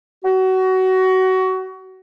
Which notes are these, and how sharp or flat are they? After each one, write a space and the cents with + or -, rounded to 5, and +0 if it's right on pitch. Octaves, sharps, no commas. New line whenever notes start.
F#4 +25